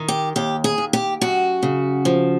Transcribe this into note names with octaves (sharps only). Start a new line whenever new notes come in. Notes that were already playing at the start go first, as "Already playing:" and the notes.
Already playing: D#3
G4
D#2 G4
G#4
D#2
G4
F#2 F#4
C#3
F3